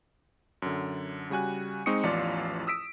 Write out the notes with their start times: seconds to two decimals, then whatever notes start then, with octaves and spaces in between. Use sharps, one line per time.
0.62 F#2 D3
1.30 C#3 G3 F#4 G#5 F#6
1.86 G#3 C4 D#4 C#6 D#6 C#7
2.03 A1 E2 F3 F4 D5 F5
2.67 D#6 E6 B6 D7